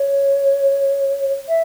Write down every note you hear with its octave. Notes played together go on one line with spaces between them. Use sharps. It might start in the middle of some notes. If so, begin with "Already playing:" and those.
Already playing: C#5
E5